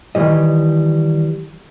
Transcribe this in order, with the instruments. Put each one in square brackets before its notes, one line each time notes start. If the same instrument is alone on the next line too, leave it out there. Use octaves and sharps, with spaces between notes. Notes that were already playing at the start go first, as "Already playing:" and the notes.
[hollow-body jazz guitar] D#3 E3 G3 D#5